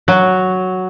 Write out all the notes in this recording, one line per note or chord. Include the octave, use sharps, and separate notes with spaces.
F#3